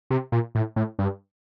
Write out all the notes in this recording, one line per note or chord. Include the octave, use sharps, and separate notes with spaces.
C3
A#2
A2
A2
G2